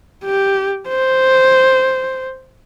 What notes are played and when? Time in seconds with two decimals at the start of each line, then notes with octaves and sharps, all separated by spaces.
0.25 G4
0.88 C5